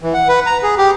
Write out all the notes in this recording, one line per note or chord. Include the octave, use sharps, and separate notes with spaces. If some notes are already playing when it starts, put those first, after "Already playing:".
E3
F#5
B4
A#5
G#4
G4